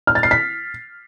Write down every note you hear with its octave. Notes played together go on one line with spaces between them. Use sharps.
F6
A6
C7
B6